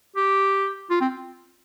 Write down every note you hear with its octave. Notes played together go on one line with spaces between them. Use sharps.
G4
F4
C4